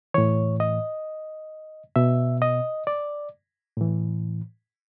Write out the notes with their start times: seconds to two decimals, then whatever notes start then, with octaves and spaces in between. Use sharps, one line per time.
0.14 A2 E3 C#5
0.60 D#5
1.96 B2 E5
2.42 D#5
2.87 D5
3.77 A2 E3